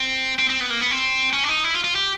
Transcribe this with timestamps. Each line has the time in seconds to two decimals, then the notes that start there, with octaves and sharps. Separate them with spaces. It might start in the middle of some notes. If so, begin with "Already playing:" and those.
Already playing: C4
0.39 C4
0.50 C4
0.60 B3
0.70 A#3
0.81 B3
0.91 C4
1.33 C#4
1.43 D4
1.49 D#4
1.64 E4
1.74 F4
1.84 F4
1.95 G4